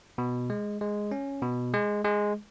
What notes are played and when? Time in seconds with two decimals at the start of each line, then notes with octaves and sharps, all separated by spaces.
0.18 B2
0.50 G#3
0.81 G#3
1.12 C#4
1.42 B2
1.74 G#3
2.05 G#3